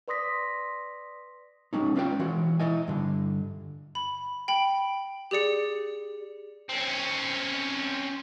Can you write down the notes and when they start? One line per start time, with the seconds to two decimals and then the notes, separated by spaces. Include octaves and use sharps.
0.08 B4 D5 C6 D#6 A#6 B6
1.73 G#3 C#4 D#4
1.96 C#4 F4 B4 D5 G5
2.19 E3 G#3 F#4
2.60 E4 D#5 G#5
2.88 G2 D3
3.95 B5
4.48 G5 B5
5.31 G4 G#4 D5 C#7
6.69 C4 C#4